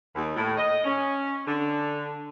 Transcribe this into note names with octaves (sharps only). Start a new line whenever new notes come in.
D#2
A2
D#5
C#4
D3